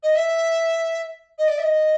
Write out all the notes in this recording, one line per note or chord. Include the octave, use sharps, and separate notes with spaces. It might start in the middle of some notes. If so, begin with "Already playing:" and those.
D#5
E5
D#5
D5
E5
D#5